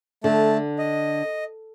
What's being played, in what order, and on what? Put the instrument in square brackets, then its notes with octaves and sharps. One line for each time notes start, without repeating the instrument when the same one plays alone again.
[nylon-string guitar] D3 [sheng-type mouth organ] A3 A5
[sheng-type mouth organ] D#5